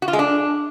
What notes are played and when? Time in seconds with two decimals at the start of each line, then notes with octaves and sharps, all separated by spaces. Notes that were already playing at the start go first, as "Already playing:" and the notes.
0.02 F#4
0.08 F4
0.13 G#3
0.19 D4